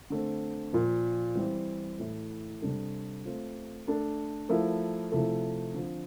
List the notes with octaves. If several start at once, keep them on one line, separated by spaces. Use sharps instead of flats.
D3 A3 C4
A#2 F3 A#3
E3 G3 C4
A2 E3 A3 E4
C3 G3 D4 A4
A3 C4 F4
A3 D4 A4
F3 A3 E4 A#4
C3 F3 A3 E4 A4
D3 F3 C4